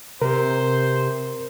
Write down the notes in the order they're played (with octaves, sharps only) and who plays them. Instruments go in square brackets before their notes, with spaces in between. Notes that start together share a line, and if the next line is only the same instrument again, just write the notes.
[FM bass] C3 [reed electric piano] A#4 [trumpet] C5